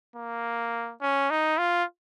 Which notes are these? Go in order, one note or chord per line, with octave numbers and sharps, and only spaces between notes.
A#3
C#4
D#4
F4